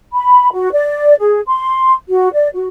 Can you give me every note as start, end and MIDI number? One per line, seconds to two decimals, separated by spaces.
0.13 0.52 83
0.53 0.69 66
0.73 1.14 74
1.19 1.40 68
1.47 1.94 84
2.09 2.28 66
2.33 2.48 74
2.54 2.67 66